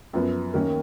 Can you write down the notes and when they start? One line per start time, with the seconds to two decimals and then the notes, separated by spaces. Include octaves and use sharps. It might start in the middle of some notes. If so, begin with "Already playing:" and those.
0.13 F#2 F3 B3
0.54 D#2 D#3 A#3 C#4 A#4